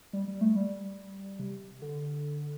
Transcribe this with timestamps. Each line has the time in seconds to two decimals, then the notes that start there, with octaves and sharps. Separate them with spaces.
0.13 G3
0.28 G3
0.41 A3
0.56 G3
1.39 C3
1.82 D3